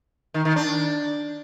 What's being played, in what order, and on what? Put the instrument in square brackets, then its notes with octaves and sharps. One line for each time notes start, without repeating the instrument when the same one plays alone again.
[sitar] D#3
D#3
D4